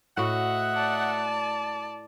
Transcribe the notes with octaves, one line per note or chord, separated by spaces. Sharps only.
A2 F#4 D#5 E5 F#5
D5 A5